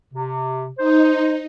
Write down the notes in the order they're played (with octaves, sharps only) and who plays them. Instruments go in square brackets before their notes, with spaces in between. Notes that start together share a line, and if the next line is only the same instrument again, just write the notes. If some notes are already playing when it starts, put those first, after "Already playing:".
[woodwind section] C3
[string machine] D#4 [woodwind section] C5